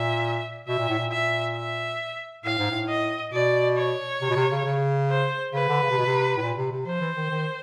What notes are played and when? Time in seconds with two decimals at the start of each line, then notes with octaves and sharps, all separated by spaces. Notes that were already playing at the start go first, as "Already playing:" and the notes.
Already playing: A#2 E5
0.68 B2 E5
0.78 A#2
0.88 A2
0.99 A#2
1.12 E5
1.56 E5
2.45 A2 F5
2.58 G#2
2.72 A2
2.89 D#5
3.33 B2 D5
3.77 C#5
4.21 C3
4.30 B2
4.36 C3
4.51 C#3
4.65 C#3
5.10 C5
5.53 C#3 B4
5.68 D3
5.83 C#3
5.90 C3
5.98 B2
6.06 C3
6.37 A2
6.42 A#2
6.58 C3
6.71 C3
6.86 F3 C5
7.01 E3
7.16 D#3
7.31 D#3